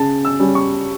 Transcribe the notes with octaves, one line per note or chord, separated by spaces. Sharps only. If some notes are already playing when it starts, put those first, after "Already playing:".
Already playing: C#3 A5
E6
G3 C#4
C#6